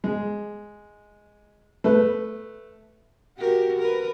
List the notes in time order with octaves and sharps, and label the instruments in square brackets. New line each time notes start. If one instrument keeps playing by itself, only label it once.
[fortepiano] G#3
A3 B4
[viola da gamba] F#4 G4 A#4
A#4 B4